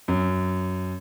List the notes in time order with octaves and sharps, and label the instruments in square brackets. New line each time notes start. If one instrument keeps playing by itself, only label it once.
[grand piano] F#2